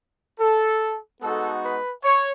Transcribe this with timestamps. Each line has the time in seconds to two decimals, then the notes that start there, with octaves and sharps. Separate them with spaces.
0.39 A4
1.22 G#3 B3 D#4 F#4 A4
1.63 B4
2.03 C#5